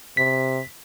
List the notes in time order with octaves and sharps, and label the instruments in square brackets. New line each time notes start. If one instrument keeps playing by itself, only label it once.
[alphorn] C3 [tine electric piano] B6